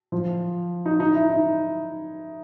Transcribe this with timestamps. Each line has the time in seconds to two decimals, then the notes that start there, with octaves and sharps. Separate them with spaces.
0.12 F3
0.86 D#4
1.00 D#4
1.15 E4
1.30 D#4